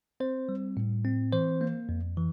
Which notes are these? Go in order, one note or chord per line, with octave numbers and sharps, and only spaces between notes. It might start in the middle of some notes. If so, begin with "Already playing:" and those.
C4 C5
G3
A2
C4
E3 C5
A#3
F2
E3